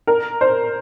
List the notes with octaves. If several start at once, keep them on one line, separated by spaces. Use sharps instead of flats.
A#4
C5